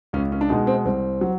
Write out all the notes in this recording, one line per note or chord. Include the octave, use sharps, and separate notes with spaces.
C#2 C#4
C#4
D4
B2 G#3 D#4
C4
C2 C4
F#3